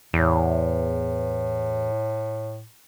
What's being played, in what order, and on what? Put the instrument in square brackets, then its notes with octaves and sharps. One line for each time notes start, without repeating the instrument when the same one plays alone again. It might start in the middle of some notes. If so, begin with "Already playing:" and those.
[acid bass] E2 [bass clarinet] A2